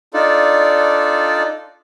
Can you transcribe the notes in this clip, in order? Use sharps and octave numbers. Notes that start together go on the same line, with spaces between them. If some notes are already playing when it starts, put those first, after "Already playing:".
D4 D#4 F4 A4 D5